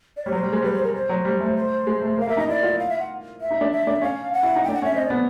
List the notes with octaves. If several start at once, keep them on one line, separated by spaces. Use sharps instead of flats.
D5
G3 C#5
F#3 C5
G3
G#3
G3 B4
C5
A#4
C5
F#3
G3
A3
C5
G#3
A3
A#3
F5
A#3 E5
D#4 D#5
E4 D5
F4
F5
E5
F#5
E5
D#4
D4
E5
D4
C#4 F5
F#5
E4
D#4
D4 G5
F#5
C#4 E5
C4 D#5
B3 D5